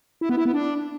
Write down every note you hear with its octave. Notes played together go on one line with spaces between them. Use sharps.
E4
B3
E4
B3
D4